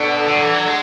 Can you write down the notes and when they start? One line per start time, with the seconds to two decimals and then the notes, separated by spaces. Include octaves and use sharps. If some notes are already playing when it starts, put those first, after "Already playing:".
Already playing: B2 D4 A4 D5 F#5
0.28 D3
0.36 F#3
0.41 E3
0.54 F#3
0.67 G#3